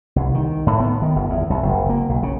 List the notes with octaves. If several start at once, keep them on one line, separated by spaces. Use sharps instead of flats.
C2
D#3
A2
B3
D#3
G1
E2
C2
F#1
A#3
B1
C#3